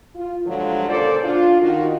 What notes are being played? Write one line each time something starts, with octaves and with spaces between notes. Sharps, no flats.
F4
G2 D3 F3 F#3 G#3 F4
A#2 C#3 A4 C5 D5
D4 F4
D#3 F4 F#4